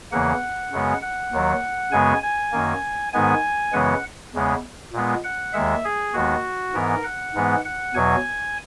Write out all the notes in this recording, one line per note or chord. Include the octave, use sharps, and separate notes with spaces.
E2 C#3 E3 A#3 F#5
F#2 C#3 G#3 B3
F#5
D#2 D#3 F#3
F#2 C#3 G#3 B3 G#5
G#5
F#2 D#3 A#3
G#2 D#3 G#3 B3 G#5
F#2 C#3 E3 G#3 B3 F#5
E2 C#3 G#3 B3
A#2 G#3 B3
F#5
D#2 D#3 G#3 E5
G#4
D#2 D#3 G#3 B3 F#4
G#2 E3 B3 A#4
F#5
G#2 E3 G#3 B3
F#5
E2 B2 F#3 G#5